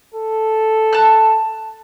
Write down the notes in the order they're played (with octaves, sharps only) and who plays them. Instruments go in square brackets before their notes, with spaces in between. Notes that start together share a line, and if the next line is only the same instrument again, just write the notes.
[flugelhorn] A4
[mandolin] A5 F#6